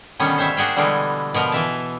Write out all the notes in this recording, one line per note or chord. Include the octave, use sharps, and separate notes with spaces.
B2 D3 D#3 G3 B3 C#4
C5 C#5 E5
A#3 D4 F#4 G#4 G5
B2 D3 E3 G3 G#3
B2 F3 A#4
E3 E5 A5